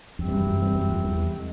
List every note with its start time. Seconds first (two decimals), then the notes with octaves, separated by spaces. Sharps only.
0.18 F2 C3 E3 G3 C4
0.28 G2
0.32 F#2
0.47 F#2
0.62 G2
0.75 F#2
0.90 F2
1.05 E2
1.34 D3 F3 G#3